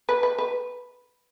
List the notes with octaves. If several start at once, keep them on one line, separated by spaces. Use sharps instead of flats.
B4
B4
B4